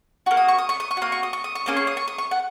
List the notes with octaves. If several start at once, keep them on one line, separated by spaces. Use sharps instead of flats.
A#3 F#4 C#6
D#6
C#6
D#6
C#6
D#6
C#6
A#3 F#4 D#6
C#6
D#6
C#6
D#6
C#6
A#3 C#4 G#4 D#6
C#6
D#6
C#6
D#6
C#6
F#5